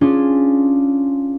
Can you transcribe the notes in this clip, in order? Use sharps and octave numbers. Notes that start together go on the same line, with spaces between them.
C#4 D4 F4 G#4